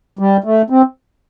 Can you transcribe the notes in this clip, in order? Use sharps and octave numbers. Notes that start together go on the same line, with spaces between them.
G3
A3
C4